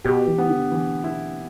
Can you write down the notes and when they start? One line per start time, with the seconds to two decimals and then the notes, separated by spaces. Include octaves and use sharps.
0.04 B2 G4
0.28 E3
0.38 B3
0.49 D3
0.72 E3
1.04 E4